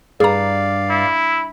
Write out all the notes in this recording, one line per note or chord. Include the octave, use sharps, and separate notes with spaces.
G2 G#4 D5 F5 A#5
E4